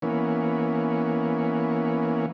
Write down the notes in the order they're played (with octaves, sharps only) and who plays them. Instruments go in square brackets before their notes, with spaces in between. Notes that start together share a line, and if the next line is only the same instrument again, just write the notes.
[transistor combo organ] E3 A#3 B3 C#4